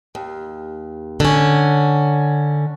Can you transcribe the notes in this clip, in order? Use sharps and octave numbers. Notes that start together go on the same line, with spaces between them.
D#2
D3 C#4